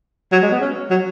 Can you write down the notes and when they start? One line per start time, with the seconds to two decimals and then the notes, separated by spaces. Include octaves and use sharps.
0.32 F#3
0.42 G#3
0.51 B3
0.61 C#4
0.90 F#3